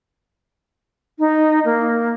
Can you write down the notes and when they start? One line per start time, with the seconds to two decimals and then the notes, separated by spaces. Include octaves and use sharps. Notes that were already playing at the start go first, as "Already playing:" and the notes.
1.19 D#4
1.65 A#3